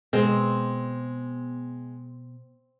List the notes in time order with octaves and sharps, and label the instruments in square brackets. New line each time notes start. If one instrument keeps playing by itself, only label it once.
[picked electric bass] B2 [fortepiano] G#3 [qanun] C4